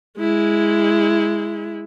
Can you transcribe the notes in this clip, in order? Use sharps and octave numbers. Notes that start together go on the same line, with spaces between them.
G#3 E4